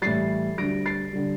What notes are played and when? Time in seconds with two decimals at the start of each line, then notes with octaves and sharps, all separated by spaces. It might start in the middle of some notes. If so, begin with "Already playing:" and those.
0.02 A2 E3 G3 A6 C7
0.58 D2 D3 G3 A#6 D7
0.86 A6 C7
1.13 D3 G3